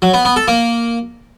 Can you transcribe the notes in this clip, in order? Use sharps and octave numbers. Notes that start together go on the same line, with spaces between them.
F#3
B3
B3
A4
A#3